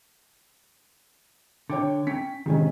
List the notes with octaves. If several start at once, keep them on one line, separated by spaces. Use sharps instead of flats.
D3 C#5 G5 D6
C#4 G5 B6
C3 D#3 G#3 C#4